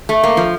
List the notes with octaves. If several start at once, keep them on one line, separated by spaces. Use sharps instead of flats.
A3
A#3
F3